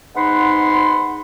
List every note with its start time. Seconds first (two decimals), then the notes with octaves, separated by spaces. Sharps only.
0.16 G#2 B3 D#4 F#5 B5 C6